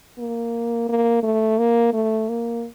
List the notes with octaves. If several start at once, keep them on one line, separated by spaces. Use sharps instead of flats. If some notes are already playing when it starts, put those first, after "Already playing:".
A#3
A#3
A3
A#3
A3
A#3